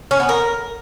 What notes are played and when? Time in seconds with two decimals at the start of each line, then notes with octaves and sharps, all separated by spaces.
0.11 C#4
0.20 B3
0.29 A#4